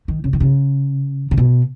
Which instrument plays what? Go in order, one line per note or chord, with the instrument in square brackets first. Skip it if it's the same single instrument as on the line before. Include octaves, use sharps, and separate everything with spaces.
[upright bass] D#3
C#3
D#3
C#3
C#3
B2